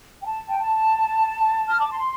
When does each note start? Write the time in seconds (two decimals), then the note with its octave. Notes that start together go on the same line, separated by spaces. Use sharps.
0.22 G5
0.26 A5
0.48 G5
0.59 A5
1.69 F6
1.80 D6
1.91 C6